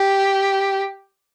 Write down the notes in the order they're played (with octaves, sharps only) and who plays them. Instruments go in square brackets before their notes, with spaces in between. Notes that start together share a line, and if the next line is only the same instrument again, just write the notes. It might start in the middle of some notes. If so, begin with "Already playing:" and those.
Already playing: [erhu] G4